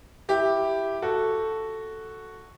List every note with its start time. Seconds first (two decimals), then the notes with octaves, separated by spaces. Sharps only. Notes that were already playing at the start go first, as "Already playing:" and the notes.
0.29 E4 G4
1.02 F#4 A4